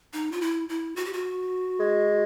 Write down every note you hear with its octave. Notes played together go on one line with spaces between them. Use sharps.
D#4
F4
E4
E4
F#4
G4
F#4
G#3